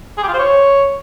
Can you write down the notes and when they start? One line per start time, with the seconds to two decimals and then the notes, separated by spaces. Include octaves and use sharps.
0.18 G#4
0.23 G4
0.28 F4
0.33 C5
0.39 C#5